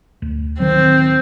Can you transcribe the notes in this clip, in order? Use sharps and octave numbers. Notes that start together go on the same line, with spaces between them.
D2
D1 D#3 F#3 C4